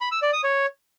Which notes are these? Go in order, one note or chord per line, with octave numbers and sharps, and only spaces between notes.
B5
E6
D5
D#6
C#5